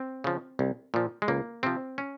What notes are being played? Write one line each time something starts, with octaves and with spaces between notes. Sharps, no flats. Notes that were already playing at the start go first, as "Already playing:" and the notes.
Already playing: C4
C#3 F3
C2
A#2 F3
G#3
C#2 A#3
C3 F3 C4
C#4